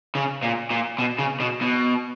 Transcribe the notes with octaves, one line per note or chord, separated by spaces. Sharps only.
C#3
A#2
A#2
B2
C#3
B2
B2